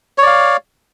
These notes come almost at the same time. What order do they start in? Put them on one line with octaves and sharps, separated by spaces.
C#5 D5 F5